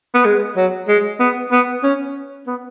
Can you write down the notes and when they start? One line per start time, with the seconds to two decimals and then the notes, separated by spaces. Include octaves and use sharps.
0.15 B3
0.25 G#3
0.57 F#3
0.88 G#3
1.20 B3
1.52 B3
1.83 C#4
2.47 B3